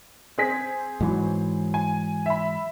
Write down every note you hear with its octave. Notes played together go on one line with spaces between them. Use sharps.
C4 G#4 B6
G#2 E3 F#3
G#5
E5 B5